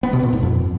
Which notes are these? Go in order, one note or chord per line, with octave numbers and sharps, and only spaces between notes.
B3
B2
A#2
G#2
F2